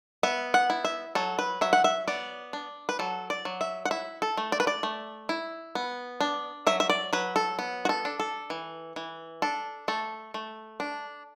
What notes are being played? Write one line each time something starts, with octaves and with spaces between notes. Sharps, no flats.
B3 E5
F#5
E4
E5
F#3 A4
B4
F#3 E5
F#5
E5
B3 D5
D4
B4
F#3 A4
D5
F#3
E5
F#5
E4 E5
A4
A3
D5
B4
D5
A3
E4
B3
D4
F#3 E5
E5
D5
F#3 B4
A4
B3
F#4
A4
D4
A4
E3
E3
D4 A4
A3 A4
A3
D4